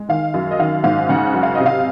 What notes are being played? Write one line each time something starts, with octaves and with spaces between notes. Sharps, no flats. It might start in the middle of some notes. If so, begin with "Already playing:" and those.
Already playing: G#3
D#3 F5
F#2
D#5
D#3 F5
G#2 F5
C#3 F#5
F#2
F5
D#5
C3
F5